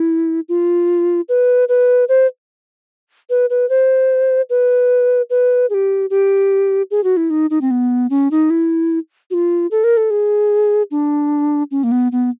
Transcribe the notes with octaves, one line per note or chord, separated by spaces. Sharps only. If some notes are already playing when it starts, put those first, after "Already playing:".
Already playing: E4
F4
B4
B4
C5
B4
B4
C5
B4
B4
G#4
G4
G4
G#4
F#4
E4
D#4
D#4
C4
B3
C#4
D#4
E4
F#4
F4
A4
A#4
A4
G#4
D4
C#4
A#3
B3
B3